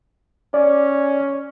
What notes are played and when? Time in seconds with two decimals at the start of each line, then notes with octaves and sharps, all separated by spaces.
0.54 C#4 D5